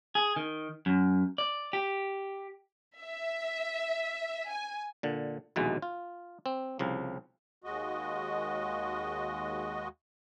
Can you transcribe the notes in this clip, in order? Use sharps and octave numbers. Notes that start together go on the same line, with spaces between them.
G#4
D#3
F#2
D5
G4
E5
G#5
A#2 D3
A#1 D#2 B2 E3 G#3
F4
C4
C2 C#3 F3
D#2 G#3 F#4 D#5